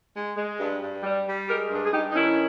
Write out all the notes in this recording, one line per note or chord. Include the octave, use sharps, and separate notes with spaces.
G#3
G#3
G2
G2
G3
G3
G#3 G4 A#4
G2
G#4
G2 D#4 G4
D#4
D#3 C#4 E4